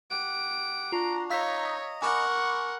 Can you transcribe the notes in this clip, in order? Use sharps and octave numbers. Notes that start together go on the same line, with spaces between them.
G4 F#5 D7
D4 F4 F#4 A#5
D#4 C#5 D#5 F5 A#5 E6 B6
A#4 F#5 G#5 B5 C#6 D6